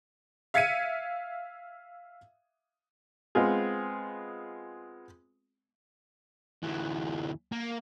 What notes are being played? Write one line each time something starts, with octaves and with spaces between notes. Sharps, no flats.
E5 F5 G#6 B6 C#7 D#7
G#3 B3 C4 F4 G#4
D2 E3
A#3